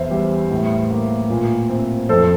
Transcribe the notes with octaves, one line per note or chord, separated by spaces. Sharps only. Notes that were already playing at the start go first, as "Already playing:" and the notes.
Already playing: E2 C5 E5
G3
A2
A#3
A#2
C4
F2 A4 C5